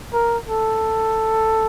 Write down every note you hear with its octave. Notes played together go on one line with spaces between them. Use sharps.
A#4
A4